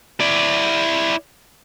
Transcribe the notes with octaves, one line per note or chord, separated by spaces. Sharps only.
E4 D5